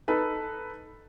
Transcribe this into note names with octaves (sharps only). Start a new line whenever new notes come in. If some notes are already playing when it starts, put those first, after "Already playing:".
D#4 A4 B4